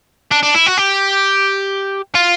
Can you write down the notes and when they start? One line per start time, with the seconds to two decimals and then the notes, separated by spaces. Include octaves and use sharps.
0.32 D4
0.43 D4
0.55 E4
0.66 F#4
0.78 G4
2.15 F4